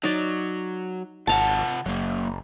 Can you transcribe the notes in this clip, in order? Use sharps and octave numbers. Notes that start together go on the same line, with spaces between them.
F#3 D#4 D5
G#1 C3 F4 F#5 A5 A#5
F#1 F#3 A#3